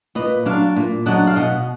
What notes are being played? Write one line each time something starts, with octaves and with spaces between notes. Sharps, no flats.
A#2 B4 D#5
F#3 D4 D5 F5
A#2
F#3 D4 D#5 F#5
F5
B2 D#5 F#5